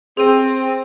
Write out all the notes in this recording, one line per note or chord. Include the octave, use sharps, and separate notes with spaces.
C4 G#4 D#7